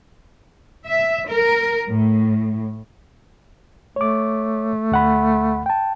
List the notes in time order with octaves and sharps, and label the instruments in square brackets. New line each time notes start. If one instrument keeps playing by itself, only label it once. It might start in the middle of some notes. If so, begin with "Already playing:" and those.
[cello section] E5
A#4
A2
[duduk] A3 [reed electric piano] C#5 D6
[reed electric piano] D2 F#5 B5
G5 A5